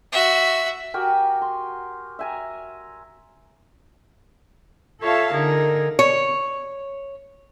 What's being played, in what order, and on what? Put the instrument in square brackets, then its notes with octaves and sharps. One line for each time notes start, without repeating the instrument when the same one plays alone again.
[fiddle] F#4 E5
[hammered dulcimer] F#4 G4 A#4 G#5
C6
E5 G#5 A#5
[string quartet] F4 A4 C#5 E5 F5 A5
D3 D#4 G#4 A#4
[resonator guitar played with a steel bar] C#5